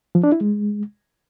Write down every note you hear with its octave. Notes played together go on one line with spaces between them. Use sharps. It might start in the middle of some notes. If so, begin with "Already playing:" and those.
F3
D4
E4
G#3